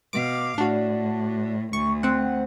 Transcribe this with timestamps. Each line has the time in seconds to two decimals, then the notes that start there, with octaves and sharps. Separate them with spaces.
0.13 B2 F5 D6
0.58 A2 D4 F#4
1.73 D2 C#6
2.03 C4 F#5